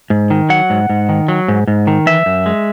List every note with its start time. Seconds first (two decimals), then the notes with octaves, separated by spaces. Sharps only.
0.10 G#2
0.30 D#3
0.49 F#3 F#5
0.70 G#2
0.90 G#2
1.09 D#3
1.28 F#3
1.48 G#2
1.67 G#2
1.87 D#3
2.06 E3 E5
2.26 F#2
2.46 G#3